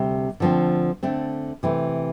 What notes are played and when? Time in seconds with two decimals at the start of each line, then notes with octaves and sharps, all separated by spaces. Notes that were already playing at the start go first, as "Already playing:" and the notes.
Already playing: D2 C3 G3
0.40 D3 F3 A3 C4
1.03 D3 A3 C4
1.63 C3 E3 A3